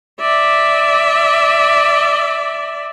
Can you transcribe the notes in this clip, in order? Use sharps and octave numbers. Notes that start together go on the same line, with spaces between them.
D5 E5